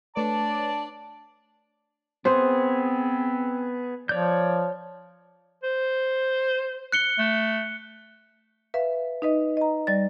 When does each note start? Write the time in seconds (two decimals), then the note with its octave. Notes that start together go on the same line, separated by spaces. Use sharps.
0.16 A3 D4 B4 C#5 D5 A5
2.25 B3 C4 G#4 C5
4.09 F3 C#5 D5 G6
5.63 C5
6.92 F#6 C#7 G7
7.19 A3
8.74 B4 E5 F5
9.22 D#4 B4 D#5
9.57 D#5 A#5
9.87 G3 D5 A6